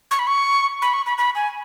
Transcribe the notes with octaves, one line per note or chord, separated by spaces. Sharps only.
C#6
B5
C#6
B5
C#6
B5
B5
G#5